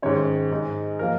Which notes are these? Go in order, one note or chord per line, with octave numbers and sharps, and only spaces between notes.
G#2 D#3 C#4 C#5
G#2 G#3 D#4
F3 A#3 A#4